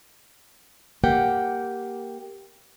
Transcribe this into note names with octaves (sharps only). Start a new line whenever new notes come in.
A#3 G4 F#5 G5